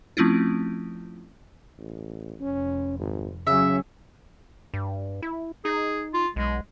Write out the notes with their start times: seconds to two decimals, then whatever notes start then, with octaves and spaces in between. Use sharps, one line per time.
0.17 F3 A3 C4 C#4 E4 F4
1.79 A1
2.40 F1 C#4
2.99 G#1
3.47 C#3 F#3 C#4 E5
4.74 G2
5.22 E4
5.65 D#4 G#4
6.14 F4
6.36 B1 G#3